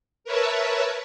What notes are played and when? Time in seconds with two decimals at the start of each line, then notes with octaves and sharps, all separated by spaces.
0.24 A#4 B4 C#5 E5 A5